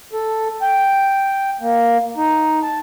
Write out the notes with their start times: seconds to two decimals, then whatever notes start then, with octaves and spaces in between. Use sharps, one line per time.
0.13 A4
0.62 G5
1.61 A#3
2.17 D#4
2.63 A5